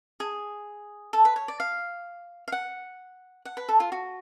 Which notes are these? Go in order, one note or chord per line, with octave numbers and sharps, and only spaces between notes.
G#4
A4
B4
C#5
D5
F5
F5
F#5
F#5
B4
A4
F4
F#4